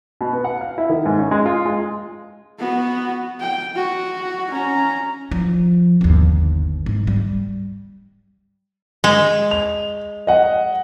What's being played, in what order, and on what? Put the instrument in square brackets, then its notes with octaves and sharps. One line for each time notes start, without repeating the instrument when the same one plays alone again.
[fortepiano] B2
B3
F#5
F5
E4
D#3
G#2
C#4
G#3
F4
G#3
[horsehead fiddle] B3 F#4
G5
F#4
C#4 A#5
[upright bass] F3
G1 D#2
G#2
G3
[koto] G#3
[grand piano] F7
D#5 F#5